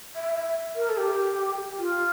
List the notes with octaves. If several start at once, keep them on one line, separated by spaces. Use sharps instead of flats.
E5
E5
A#4
A4
G4
F4